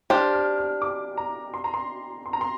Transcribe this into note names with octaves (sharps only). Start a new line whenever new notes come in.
D4 G4 C5 F6
F6
F6
D6
A#5
C6
A#5
C6
C6
A#5
C6